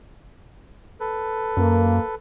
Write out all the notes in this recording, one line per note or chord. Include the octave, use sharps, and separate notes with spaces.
A4 B4
F#2 A#3